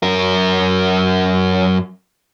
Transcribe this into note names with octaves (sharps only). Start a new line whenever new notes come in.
F#2 A#4